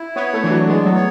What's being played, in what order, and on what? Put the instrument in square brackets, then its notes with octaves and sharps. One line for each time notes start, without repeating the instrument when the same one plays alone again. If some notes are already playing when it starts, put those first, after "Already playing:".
Already playing: [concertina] E4
[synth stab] B3 [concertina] C#5
[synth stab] A3
[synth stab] E3 [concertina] D4
[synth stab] F#3
[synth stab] G#3 [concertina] B3
[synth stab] F#3
[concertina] C#5